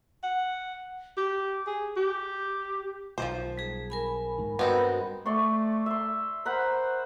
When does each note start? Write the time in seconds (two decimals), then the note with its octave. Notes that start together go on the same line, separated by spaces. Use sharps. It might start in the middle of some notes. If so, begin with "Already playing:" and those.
0.23 F#5
1.17 G4
1.67 G#4
1.96 G4
3.18 B1 D#3 F3 A3 C5
3.58 G3 G#4
3.90 A#4 G#5 B5
4.38 G#2 D#3
4.59 G2 G#3 B3 C4 D#4 F#4 A#4 B5
5.26 A3 D5 C6 C#6
5.86 E5 C6
6.45 A#4 C5 F#5 B5